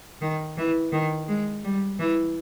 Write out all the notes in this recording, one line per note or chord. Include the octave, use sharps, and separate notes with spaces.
D#3
E3
D#3
G#3
G3
E3